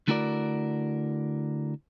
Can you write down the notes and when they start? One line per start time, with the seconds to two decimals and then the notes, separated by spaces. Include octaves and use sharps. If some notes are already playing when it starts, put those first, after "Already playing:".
0.08 D3 A3 E4 F#4 A#4 D5